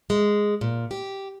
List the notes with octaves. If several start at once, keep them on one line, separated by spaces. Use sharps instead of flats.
G#3
A#2
G4